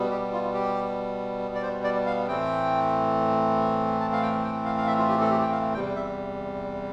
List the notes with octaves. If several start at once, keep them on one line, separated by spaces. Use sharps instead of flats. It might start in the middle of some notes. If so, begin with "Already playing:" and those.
Already playing: B2 G3 B3
G4
F4
G4
D5
C5
D5
F5
A2 E3 A3 C4 G5
A5
F5
G5
G5
F5
F5
E5
F4
G4
A4
G4
G5
F5
E2 C3 G3 G5
E5